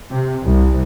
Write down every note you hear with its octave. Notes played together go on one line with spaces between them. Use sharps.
C3
C2